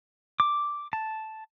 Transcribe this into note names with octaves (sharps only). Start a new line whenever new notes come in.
D6
A5